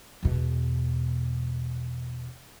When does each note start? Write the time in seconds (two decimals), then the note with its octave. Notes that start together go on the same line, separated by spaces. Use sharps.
0.23 E2 B2